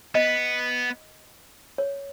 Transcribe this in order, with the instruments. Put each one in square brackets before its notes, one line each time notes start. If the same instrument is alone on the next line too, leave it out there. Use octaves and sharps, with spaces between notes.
[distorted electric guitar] B3 [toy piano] D#5
[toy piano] C#5